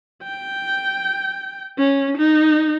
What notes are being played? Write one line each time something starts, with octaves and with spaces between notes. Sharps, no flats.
G5
C#4
D#4